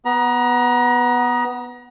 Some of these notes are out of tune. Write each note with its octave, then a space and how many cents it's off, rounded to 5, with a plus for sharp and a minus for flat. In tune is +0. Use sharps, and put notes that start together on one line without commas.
B3 +0 A#5 +30